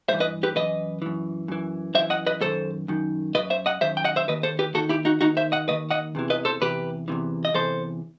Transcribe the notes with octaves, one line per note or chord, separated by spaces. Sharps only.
G2 E3 C5 E5
B4 D#5
G4 B4
F#2 E3 B4 D#5
F#2 E3
F#2 E3
F#2 E3 C5 E5
D#5 F#5
B4 D#5
F#2 D#3 A4 C5
F#2 D#3
D#3 B4 D#5
F#2
C5 E5
D#5 F#5
F#2 D#3 C5 E5
G5
D#5 F#5
C5 E5
D#2 D#3 B4 D#5
A4 C5
G4 B4
D#2 D#3 F#4 A4
E4 G4
D#4 F#4
D#2 D#3 D#4 F#4
C5 E5
D#5 F#5
D#2 D#3 B4 D#5
D#5 F#5
E2 C3 E3
B4 D#5
A4 C5
E2 C3 E3 G4 B4
E2 C3 E3
D#5
E2 C3 E3 A4 C5